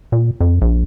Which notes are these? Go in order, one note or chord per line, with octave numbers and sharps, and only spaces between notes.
A#2
F2
A#1